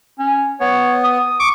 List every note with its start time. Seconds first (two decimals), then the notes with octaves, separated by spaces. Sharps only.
0.19 C#4
0.61 B3 C#5
1.04 D#6
1.40 C#6 D6